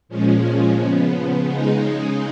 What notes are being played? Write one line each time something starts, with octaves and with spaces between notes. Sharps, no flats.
A#2 F3 G#3 C#4
C#3 F3 B3
C#3 G#3 D#4